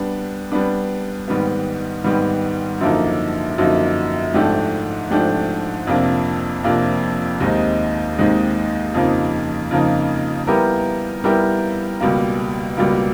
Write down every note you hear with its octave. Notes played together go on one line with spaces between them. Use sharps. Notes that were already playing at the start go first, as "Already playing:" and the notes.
Already playing: G3 B3 D4
G3 B3 D4
G#2 D#3 G3 B3
G#2 D#3 G3 B3
F#2 D3 F3 A#3 D#4
F#2 D3 F3 A#3 D#4
G#2 F3 A3 D4 G4
G#2 F3 A3 D4 G4
F2 C3 F3 A#3 D4
F2 C3 F3 A#3 D4
D#2 D#3 G#3 C4 D#4
D#2 D#3 G#3 C4 D#4
F2 C#3 F3 A#3 D#4
F2 C#3 F3 A#3 D#4
G3 B3 E4 G4 A#4
G3 B3 E4 G4 A#4
C#2 B2 G3 A#3
C#2 B2 G3 A#3